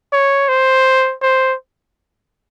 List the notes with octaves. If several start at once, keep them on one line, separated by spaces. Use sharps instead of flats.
C#5
C5
C5